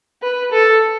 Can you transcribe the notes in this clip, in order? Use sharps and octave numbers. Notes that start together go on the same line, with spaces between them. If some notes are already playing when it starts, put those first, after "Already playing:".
B4
A4